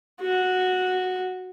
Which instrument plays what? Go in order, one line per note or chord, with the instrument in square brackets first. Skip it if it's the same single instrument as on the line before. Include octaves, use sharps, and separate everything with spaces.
[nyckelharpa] F#4